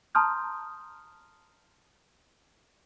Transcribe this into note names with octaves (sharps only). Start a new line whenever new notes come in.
A5 A#5 C6 D#6 F6 G6